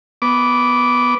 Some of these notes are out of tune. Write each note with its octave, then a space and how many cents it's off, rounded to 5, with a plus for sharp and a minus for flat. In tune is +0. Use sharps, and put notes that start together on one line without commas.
B3 +0 D6 -15